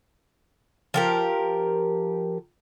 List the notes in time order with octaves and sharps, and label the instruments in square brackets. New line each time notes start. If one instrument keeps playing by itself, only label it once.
[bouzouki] F3 G4 A#4